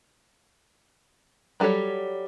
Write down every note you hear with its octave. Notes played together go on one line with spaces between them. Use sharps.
F#3 G3 G4 A4 C#5